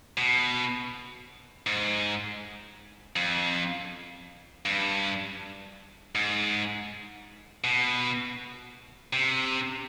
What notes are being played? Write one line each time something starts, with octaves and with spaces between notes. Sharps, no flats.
B2
G#2
F2
G2
G#2
B2
C3